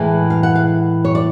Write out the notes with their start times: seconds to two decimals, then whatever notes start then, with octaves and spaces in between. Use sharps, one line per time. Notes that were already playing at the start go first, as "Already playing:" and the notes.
Already playing: A2 E3 G#3
0.30 F5
0.43 F#5
0.55 F5
1.05 C#5
1.15 D5